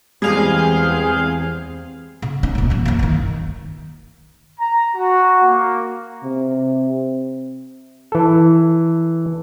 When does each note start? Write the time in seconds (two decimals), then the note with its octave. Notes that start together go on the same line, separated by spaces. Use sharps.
0.22 E2 G3 G#3 C4 G#4 F5 G6
2.22 C#3
2.43 C#4 D#4
2.55 D#1 B2
2.70 E3 F#3
2.85 F#1 F#2
2.99 D#3 E3
4.59 A#5
4.96 F#4
5.45 A#3
6.24 C3
8.12 E3 A4